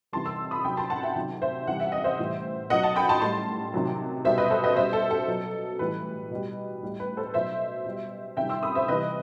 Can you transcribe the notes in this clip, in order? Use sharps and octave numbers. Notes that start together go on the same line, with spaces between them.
C3 E3 G3 A5 C6
C6 E6
B5 D#6
C3 F#3 G5 B5
A5 C6
F#5 A5
E5 G5
C3 D#3 F#3
C5 E5
C3 E3 G3 F#5
E5
D#5
C5 E5
A2 E3 G3
B2 F#3 D#5 F#5
F#5 A5
G5 B5
A5 C6
A2 G3 A5 C6
C3 D#3 F#3
B2 G3 C5 E5
B4 D#5
A4 C5
B4 D#5
B2 G3 C5 E5
A4
A4
B2 F#3
A2 E3 G3 B4
B2 G3
A2 G3
B4
A4 C5
B2 F#3 C5 E5
B2 G3
C3 D#3 G3 E5 G5
C6 E6
B5 D#6
C5 E5
C3 E3 G3 B4 D#5